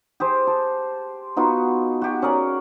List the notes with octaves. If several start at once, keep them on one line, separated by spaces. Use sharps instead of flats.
G4 G#4 C5
A5
B3 D#4 F4 F#4
F#4 G4
C#4 G#4 A#4 D5